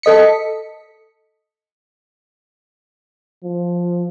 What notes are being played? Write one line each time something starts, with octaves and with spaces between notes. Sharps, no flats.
A4 D#5 B6 C#7
F3